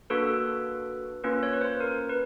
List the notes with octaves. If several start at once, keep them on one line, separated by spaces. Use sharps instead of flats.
A#3 D4 F#4 A4 B4
A#3 C#4 F4 B4
C#5
B4
C5
A#4
B4